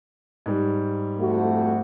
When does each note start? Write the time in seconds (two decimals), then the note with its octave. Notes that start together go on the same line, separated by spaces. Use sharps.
0.46 G#2 G3
1.18 F2 A3 F#4